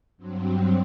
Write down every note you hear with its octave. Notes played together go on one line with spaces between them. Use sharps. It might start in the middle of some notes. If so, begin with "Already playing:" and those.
G2 F#3 C4